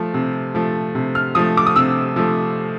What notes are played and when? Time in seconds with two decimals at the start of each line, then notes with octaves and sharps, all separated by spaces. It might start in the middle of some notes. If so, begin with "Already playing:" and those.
Already playing: F3 A3
0.14 C3
0.55 F3 A3
0.95 C3
1.15 F6
1.35 F3 A3 D#6
1.57 D6
1.66 D#6
1.76 C3 E6
2.16 F3 A3